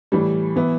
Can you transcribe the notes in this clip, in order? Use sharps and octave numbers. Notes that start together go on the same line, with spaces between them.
A2 E3 G3
E3 B3 E4